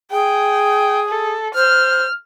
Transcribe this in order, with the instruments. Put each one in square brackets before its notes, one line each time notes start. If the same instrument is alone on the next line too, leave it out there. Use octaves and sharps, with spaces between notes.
[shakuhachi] G#4 [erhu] G5
[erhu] A4
[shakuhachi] C5 [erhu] F6